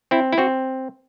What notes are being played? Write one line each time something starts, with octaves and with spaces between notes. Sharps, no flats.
C4 E4
E4
C4 F#4